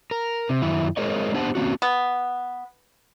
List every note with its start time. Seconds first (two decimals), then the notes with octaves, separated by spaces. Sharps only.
0.11 A#4
0.49 C3
0.62 F#2 D#3 E4 E5
0.97 G#3 G#4 A#4 C5 C#5 D#5
1.34 B3 D4 G4 C5 F#5 A5
1.55 A#3 C4 C#4 F#4
1.82 B3